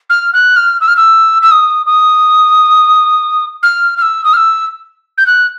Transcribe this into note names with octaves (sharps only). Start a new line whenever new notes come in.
F6
F#6
F6
E6
F6
E6
E6
D#6
D#6
F6
F6
E6
D#6
F6
E6
G6
F#6